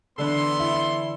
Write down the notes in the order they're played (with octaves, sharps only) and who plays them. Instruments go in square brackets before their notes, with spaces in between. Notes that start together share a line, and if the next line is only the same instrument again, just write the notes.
[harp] D3 E3 D4 [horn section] B3 A4 C6
[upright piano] E4